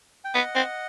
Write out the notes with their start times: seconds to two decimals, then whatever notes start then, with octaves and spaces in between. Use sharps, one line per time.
0.25 G5
0.34 B3 D#5 F#5
0.55 C4